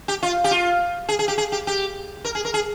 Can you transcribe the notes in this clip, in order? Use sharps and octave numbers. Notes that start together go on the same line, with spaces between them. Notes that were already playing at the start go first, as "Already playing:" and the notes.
G4
F4
G4
F4
G#4
G#4
G4
G#4
G4
G4
A#4
G#4
A#4
G#4